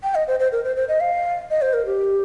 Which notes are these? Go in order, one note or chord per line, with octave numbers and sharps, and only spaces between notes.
G5
D#5
C5
C5
A#4
C5
C5
D#5
F5
D#5
C5
A#4
G4